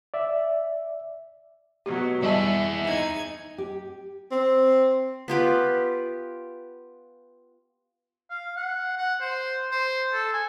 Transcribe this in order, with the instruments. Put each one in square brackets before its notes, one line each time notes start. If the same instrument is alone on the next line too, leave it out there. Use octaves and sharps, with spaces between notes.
[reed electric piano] D5 E5
[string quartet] B2 F#3 [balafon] G4
[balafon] G3 D#5 A5 [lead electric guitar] E4 G#4 [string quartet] E5
[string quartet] D#4 G#6
[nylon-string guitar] G4
[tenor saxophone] C4
[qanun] B3 F4 G4 B4
[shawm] F5
F#5
F#5
C5
C5
A4
G#5